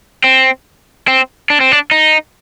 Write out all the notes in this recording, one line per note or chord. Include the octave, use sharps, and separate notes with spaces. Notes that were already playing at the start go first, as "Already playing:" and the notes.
C4
C4
D4
C4
D4
D#4